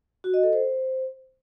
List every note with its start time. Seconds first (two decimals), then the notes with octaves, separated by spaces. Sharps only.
0.24 F#4
0.34 D#5
0.43 A4
0.53 C5